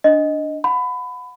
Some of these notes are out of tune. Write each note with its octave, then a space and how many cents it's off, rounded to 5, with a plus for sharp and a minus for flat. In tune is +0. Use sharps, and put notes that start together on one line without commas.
D4 +0 D#5 +0
F#5 -35 B5 +25